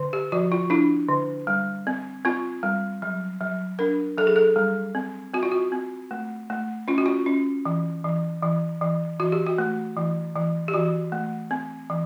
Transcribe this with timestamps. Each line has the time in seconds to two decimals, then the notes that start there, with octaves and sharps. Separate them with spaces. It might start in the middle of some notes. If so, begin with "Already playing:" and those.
Already playing: D3
0.13 G4
0.32 F3 F#4
0.52 F4
0.70 D4 E4
1.09 D3
1.47 G3
1.87 C4
2.25 C4 F4
2.63 G3
3.02 F#3
3.41 F#3
3.79 D4 A#4
4.18 F#3 A4
4.27 G#4
4.36 A4
4.56 G3
4.95 C4
5.34 C4 F#4
5.43 F4
5.52 F#4
5.72 C4
6.11 A3
6.50 A3
6.88 C#4 F4
6.98 F#4
7.06 F4
7.26 C#4
7.66 E3
8.05 E3
8.43 E3
8.82 E3
9.20 E3 F#4
9.32 G4
9.46 F#4
9.58 A3
9.97 E3
10.36 E3
10.68 G4
10.74 E3 F#4
11.12 A3
11.51 C4
11.90 E3